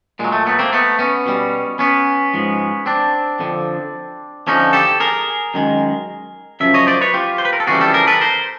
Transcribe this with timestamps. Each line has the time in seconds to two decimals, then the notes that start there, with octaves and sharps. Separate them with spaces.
0.19 A#2 F#3 G#3
0.32 A3
0.47 A3 B3
0.59 A#3 C4
0.72 A3 B3
0.99 B3 C#4
1.26 B2 G3
1.79 B3 C#4
2.34 G#2 F3 G#3
2.86 C4 D4
3.39 F2 D3 F3
4.47 F2 D3 F3 C#4 D#4
4.73 G4 A4
5.00 G#4 A#4
5.54 F#2 D#3 G#3
6.60 F#2 C#3 F3 E5
6.74 C#5 D#5
6.87 C5 D5
7.01 B4 C#5
7.14 F4 G4
7.38 C5
7.45 B4
7.53 A#4
7.60 A4
7.67 F2 C#3 E3 G3 F#4 G#4
7.81 G4 A4
7.94 G#4 A#4
8.07 A4 B4
8.21 A#4 C5